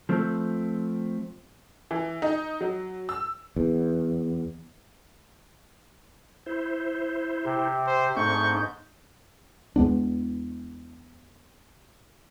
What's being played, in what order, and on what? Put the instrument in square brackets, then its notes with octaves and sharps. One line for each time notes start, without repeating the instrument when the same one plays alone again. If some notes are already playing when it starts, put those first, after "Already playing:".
[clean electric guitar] F3 A3 C4
[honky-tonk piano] E3
D#4
F#3
E6
[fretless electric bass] E2
[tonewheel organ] E4 C5
[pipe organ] C3
[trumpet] C5
[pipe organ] G#2 G6 [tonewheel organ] A3 C4 D4 [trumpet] C#6
[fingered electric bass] E2 G#3 B3 D4